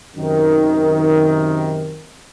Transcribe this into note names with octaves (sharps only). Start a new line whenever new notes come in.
F#2 C3 D#3